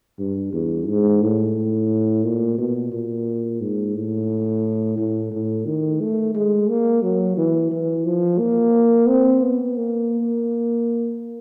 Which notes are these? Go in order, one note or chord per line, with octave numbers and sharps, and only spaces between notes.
G2
E2
G#2
A2
A#2
B2
A#2
G#2
A2
A2
A2
D#3
A3
G#3
A#3
F#3
E3
E3
F3
A#3
C4
B3
A#3